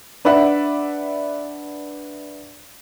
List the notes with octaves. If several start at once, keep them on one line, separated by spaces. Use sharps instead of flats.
D4 B4 D5 E5 F#5